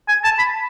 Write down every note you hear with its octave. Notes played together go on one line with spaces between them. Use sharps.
G#5
A5
B5